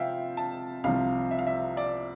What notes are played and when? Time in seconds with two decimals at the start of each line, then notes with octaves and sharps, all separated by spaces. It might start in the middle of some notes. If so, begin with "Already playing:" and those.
Already playing: C3 F3 E5 F5 G5
0.37 A5
0.84 C2 C3 F3 F5
1.31 E5
1.39 F5
1.47 E5
1.77 D5